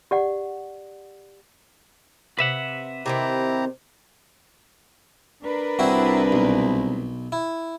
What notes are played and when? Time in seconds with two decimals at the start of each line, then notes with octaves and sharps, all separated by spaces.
0.11 G4 D5 F#5
2.39 C3 B4 E5 F#5
3.06 C3 D#3 C4 E4 G4 A#5
5.44 D4 A#4 B4
5.79 C2 C4 E4 F#4
6.32 B1
7.32 E4